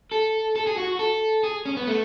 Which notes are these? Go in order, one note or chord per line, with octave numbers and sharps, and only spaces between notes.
A4
A4
G#4
F#4
A4
G#4
C#4
B3
A3